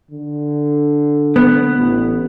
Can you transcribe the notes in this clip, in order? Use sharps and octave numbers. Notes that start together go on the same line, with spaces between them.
D3
B3
A1